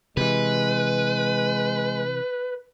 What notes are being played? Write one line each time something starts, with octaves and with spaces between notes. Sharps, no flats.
C3 E3 G#3 B4